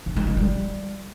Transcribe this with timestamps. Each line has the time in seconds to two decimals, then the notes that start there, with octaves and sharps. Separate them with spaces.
0.06 C3
0.16 G#3
0.27 C#3
0.37 G3